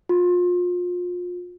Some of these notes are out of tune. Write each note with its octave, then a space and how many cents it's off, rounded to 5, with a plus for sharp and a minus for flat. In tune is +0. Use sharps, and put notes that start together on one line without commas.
F4 +30